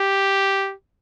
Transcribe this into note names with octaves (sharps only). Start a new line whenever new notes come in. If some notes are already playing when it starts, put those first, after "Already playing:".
Already playing: G4